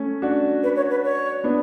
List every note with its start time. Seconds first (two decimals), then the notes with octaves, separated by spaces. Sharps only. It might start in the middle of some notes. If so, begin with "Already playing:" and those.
Already playing: A3 C#4
0.22 D4 F#4
0.63 B4
0.77 C#5
0.91 B4
1.04 C#5
1.44 B3 D4